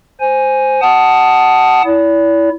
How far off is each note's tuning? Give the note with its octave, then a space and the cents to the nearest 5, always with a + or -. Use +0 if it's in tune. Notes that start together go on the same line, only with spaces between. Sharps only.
C5 +0 G#5 +0
F#5 +15 A5 +0 D#6 +0
E4 +0 D5 -45